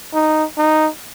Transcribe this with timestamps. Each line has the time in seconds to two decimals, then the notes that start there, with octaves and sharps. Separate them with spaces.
0.14 D#4
0.57 D#4